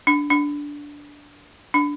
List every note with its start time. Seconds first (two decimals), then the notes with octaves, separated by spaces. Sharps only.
0.07 D4
0.30 D4
1.74 D4